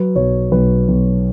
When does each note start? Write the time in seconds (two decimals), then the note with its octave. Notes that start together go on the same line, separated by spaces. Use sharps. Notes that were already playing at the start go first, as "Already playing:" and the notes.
Already playing: F#3 B4
0.15 B1 C#5
0.51 B1 B4
0.88 B1